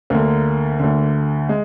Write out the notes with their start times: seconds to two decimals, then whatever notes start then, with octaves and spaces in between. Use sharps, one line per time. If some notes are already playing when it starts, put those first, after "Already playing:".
0.10 D2 D3 A#3
0.79 D2 D3
1.49 G#3